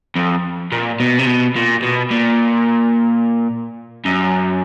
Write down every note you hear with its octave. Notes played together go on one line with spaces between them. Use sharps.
F2
A#2
B2
C3
B2
A#2
B2
A#2
F#2